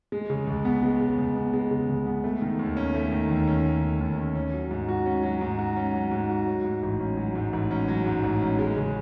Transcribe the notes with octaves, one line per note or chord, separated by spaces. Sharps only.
G#3
C#3
C#2
B3
G#3
C#3
C#2
B3
G#3
C#3
C#2
B3
A3
D#3
D#2
C#4
A3
D#3
D#2
C#4
A3
D#3
D#2
C#4
C#4
F#3
G#2
F#4
C#4
F#3
G#2
F#4
C#4
F#3
G#2
F#4
F#3
G#2
A1
C#4
F#3
G#2
A1
C#4
F#3
G#2
A1
C#4
G#3
C#3